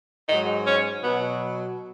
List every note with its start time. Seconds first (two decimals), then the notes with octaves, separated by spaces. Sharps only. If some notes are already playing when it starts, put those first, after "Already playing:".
0.28 G#2 F#3 D#4
0.66 C#4
1.03 B2 F#3 B3